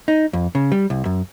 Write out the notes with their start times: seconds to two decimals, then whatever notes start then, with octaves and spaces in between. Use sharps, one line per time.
0.08 D#4
0.33 F2
0.55 C#3
0.72 G3
0.90 C2
1.05 F#2